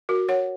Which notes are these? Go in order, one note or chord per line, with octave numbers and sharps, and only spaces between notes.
F#4 A#4
C#5 F#5